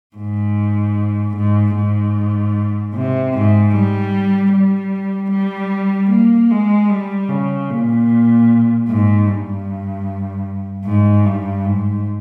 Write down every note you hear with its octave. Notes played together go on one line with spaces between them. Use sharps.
G#2
G#2
G#2
C3
G#2
G3
G3
G3
A#3
G#3
G3
C#3
A#2
G#2
G2
G#2
G2
G#2